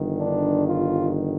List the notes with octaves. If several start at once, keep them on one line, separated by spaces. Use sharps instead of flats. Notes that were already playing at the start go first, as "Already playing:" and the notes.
Already playing: G1 G2 D#3
D4
F4